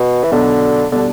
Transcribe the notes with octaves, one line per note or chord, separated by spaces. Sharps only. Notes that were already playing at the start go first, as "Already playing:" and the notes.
Already playing: B2
E3
B1 B2 D3 F#3 B3 D4
B2 D3 G3 D4